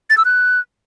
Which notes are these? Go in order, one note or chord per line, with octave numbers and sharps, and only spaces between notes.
A6
E6
F#6